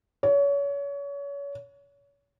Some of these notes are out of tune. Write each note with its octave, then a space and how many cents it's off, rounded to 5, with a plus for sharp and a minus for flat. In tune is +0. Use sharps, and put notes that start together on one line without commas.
C#5 +30